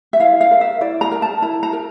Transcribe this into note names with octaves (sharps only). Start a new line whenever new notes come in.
E5
E4 F5
F5
A#4
E5
E4 D5
A#5
A#4
A5
E4 A#5
A#5
A#4